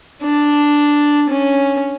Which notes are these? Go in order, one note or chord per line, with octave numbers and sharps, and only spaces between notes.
D4
C#4